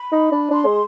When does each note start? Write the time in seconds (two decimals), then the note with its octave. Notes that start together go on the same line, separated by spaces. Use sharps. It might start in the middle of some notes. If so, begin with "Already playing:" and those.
Already playing: B5
0.12 D#4
0.32 D4
0.51 D4 C6
0.65 G#3